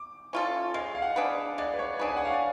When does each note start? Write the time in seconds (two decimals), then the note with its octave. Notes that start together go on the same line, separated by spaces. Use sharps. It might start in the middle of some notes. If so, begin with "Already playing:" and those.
Already playing: D6
0.33 C#4 F4 A4
0.74 G#3 F6
0.95 F5
1.02 F#5
1.16 D4 G#4 B4
1.58 G#3 D5
1.74 B4
1.79 C#5
1.99 D4 G#4 B4 C#5
2.08 G#5
2.17 F#5
2.25 F5
2.33 D5